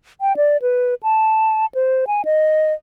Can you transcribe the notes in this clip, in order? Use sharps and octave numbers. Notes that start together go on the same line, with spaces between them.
G5
D5
B4
A5
C5
G#5
D#5